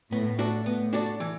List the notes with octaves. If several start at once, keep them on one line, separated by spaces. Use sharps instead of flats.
A2 B3
D4 F#4 A4 D5
A2 B3
D4 F#4 A4 D5
E3